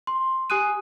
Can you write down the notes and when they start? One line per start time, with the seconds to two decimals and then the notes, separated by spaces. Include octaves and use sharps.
0.07 C6
0.50 G4 G#5 D#6 F#6 D#7